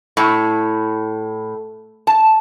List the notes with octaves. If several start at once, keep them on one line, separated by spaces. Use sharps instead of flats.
A2
A5